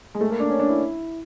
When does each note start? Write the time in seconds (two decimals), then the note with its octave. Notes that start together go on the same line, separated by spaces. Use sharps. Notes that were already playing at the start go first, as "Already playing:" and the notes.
0.15 G#3
0.21 A3
0.30 A#3
0.40 D4
0.50 C#4
0.60 D4
0.69 E4